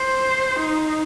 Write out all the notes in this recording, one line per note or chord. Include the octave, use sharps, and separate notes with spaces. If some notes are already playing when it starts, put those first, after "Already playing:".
Already playing: C5
D#4